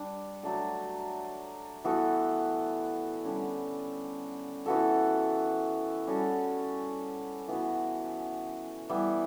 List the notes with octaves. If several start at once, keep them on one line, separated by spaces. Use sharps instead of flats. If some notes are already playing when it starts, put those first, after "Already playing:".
Already playing: G3 D4
F#3 A3 D4 A4
E3 B3 F#4 A4
D3 G3 C#4
E3 B3 F#4 A4
G3 C#4 F#4 A4
E3 B3 F#4
E3 G3 B3